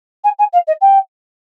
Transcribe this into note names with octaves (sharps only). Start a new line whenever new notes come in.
G#5
G#5
F5
D#5
G5